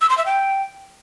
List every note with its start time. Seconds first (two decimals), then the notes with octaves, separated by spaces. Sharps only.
0.01 E6
0.09 C6
0.18 E5
0.26 G5